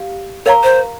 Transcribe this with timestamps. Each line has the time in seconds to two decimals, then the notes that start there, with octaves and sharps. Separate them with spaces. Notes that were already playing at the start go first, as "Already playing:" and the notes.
Already playing: G4 F5
0.46 A#4 C#5 F5 A#5 C#6
0.63 C5